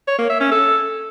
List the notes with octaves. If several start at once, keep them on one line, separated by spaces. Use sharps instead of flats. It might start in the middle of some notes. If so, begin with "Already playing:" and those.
C#5
A#3
E5
C#4
A4